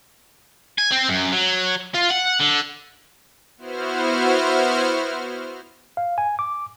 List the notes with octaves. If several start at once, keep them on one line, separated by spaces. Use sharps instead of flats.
G#5
C4
F#2
F#3
F4
F#5
D3
B3 E4 F#4 C5 F6
F5
G#5
D6